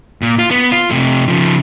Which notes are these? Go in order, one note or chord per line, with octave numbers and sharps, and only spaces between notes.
A#2
F4
B3
F4
C3 A3
C#3 F3